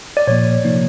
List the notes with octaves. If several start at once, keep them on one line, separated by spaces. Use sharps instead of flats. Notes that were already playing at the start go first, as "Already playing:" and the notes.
D5
A#2 F3 A#3 C#5
C3 F3 A#3 D#4